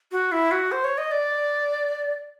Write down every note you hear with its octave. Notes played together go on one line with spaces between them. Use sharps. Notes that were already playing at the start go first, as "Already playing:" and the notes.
F#4
E4
F#4
C5
C#5
D#5
D5